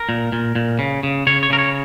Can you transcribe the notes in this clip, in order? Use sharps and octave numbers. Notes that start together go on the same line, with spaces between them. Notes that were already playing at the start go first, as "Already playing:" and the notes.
Already playing: A#4
A#2
A#2
A#2
C#3
C#3
C#3 C#5
C#5
C#3 A#4
C#5